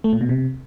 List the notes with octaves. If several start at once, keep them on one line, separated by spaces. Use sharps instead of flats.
A3
A#2
B2
C3